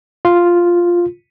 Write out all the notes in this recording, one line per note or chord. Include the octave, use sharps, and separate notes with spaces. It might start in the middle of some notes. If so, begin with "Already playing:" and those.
F4